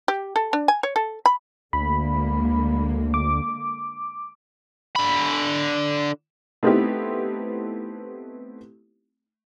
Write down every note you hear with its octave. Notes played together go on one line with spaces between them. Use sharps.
G4
A4
D4
G#5
C#5
A4
B5
D2 D3 G#3 A#3 B5
D6
D3 B5
A3 B3 C4 D#4 E4 G4